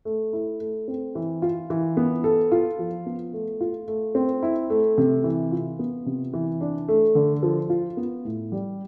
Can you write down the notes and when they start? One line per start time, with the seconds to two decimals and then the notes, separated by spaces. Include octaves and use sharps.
0.05 A3
0.33 E4
0.60 A3
0.88 C4
1.15 E3
1.42 F4
1.70 E3
1.97 B3
2.24 A4
2.52 F4
2.79 F3
3.06 B3
3.33 A3
3.61 F4
3.88 A3
4.15 C4
4.43 E4
4.70 A3
4.98 C3
5.24 E3
5.52 F4
5.79 B3
6.06 C3
6.33 E3
6.61 D4
6.88 A3
7.15 D3
7.43 F3
7.70 F4
7.97 B3
8.25 A2
8.52 G3